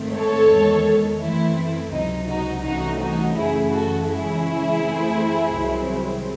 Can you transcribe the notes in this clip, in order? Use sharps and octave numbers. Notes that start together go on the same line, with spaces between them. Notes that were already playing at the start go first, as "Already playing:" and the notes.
Already playing: G#2 D#3 A3 C4
A4 C#5
E2 D#3 G#3
F#2 E3 A3 C4 E4
C#2 C3 F#3 D#4
D#4 F#4
C2 C3 E3 A3 C#4 D#4 F#4
D#4 F#4
F#2 C#3 E3 A3 E4 G#4
F#4 A4
F#2 C#3 E3 G#3 C#4 E4 G#4
F#2 E3 A3 C4
C2 C3 D#3 F#3 C4